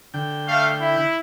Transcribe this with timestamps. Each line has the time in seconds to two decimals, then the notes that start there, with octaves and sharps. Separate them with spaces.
0.14 D3 G5
0.47 A3 F5
0.81 E4